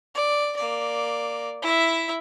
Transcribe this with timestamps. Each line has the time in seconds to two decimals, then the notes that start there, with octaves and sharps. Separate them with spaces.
0.15 D5
0.57 A#3 D5
1.62 E4 E5